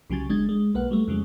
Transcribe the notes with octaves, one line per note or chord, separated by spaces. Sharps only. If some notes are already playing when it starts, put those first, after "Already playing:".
C2 C#3 F#3 G#5 A6
G1 G#3 D4 G#6
G#3
B1 A#3 B4 F#5
F#3 G3 A3
F2 C#3 F#3 G#3